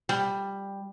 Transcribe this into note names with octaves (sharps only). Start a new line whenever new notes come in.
G3